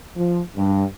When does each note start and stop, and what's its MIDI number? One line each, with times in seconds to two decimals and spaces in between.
0.16 0.40 53
0.56 0.84 43